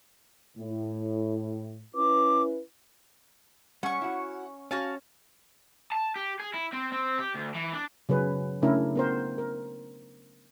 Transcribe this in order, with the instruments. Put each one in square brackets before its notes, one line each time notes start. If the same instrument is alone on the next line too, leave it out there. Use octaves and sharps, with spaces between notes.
[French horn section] A2
[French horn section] C#4 E4 B4 [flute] D6
[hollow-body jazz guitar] G3 [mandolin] C#4 C#6 [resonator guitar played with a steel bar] F#5
[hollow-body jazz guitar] E4 F#4
[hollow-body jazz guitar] C#4 [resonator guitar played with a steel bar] F#4 G#5 [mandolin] F5 A5
[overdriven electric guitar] A5
G4
G#4
E4
C4
C4
G4
D2
E3
D4
[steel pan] C#3 F#3 G#4 B4
C#3 A3 C#4 D4 E4 A#4
B3 A#4 C5
A#4